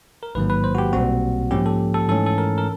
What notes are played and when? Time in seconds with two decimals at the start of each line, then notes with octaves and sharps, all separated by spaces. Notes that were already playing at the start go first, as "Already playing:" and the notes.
0.23 A#4
0.35 A1 G#2 D#3 F#3 A#3 B4
0.50 B4
0.64 C5
0.75 F#4
0.78 G4
0.93 B1 A#2 G3 C4 F#4
1.51 G#2 F3 A#3 C#4 G4
1.66 A4
1.94 A4
2.09 G#2 E3 A3 C#4 A4
2.26 A4
2.38 A#4
2.58 A#4